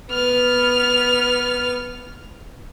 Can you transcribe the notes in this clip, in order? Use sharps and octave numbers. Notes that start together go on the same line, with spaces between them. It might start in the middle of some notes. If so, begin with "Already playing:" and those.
B3 F6